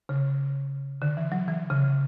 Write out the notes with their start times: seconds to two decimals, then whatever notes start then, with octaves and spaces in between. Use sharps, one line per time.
0.09 C#3
1.02 D3
1.17 E3
1.32 F#3
1.48 E3
1.70 C#3